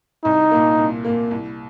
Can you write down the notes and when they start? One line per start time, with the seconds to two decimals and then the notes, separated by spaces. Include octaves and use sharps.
0.24 C2 D#4
0.51 A#2 A#3
0.79 C2
1.05 A#2 A#3
1.31 C2